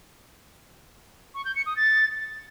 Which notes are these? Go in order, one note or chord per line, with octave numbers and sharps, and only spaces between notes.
C#6
G6
C#7
D#6
A6